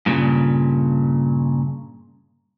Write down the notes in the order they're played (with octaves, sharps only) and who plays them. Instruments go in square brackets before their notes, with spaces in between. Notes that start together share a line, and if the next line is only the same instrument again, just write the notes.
[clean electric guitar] G2 A#2 C#3